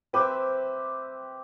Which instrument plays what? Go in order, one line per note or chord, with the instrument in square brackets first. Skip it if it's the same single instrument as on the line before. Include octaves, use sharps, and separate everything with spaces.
[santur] C4 G4 C5 E5 [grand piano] B4